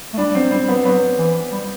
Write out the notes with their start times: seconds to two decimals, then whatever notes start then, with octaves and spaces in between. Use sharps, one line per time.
0.14 A3
0.17 G3 D4
0.35 F#3 C4
0.51 G3 C4
0.68 F#3 B3
0.85 F#3 B3
1.18 E3
1.52 G3